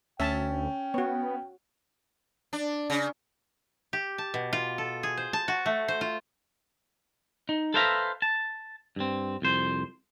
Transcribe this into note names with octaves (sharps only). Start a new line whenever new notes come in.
D2 C#4 E5 G5 A5
B3 F#4 C#5
D4
C#3
G4
A5
B2
F4
A4
G#4
C5
A5
F#4
A3
C5
F4
D#4
A4 B4 C5 E5 F5 A#5
A5
G2 C4
C2 F2 C5